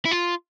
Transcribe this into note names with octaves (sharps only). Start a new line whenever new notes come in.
E4
F4